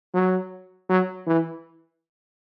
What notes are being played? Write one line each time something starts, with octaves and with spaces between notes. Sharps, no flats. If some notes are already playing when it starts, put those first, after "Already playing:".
F#3
F#3
E3